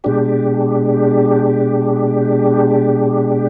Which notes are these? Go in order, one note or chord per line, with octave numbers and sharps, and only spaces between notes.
B2 G#3 D4 G4